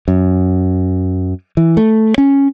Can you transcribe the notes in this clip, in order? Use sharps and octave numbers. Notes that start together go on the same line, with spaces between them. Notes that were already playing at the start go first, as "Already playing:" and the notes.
F#2
E3
A3
C#4